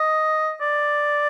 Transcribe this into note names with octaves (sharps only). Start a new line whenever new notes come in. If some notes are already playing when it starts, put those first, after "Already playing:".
Already playing: D#5
D5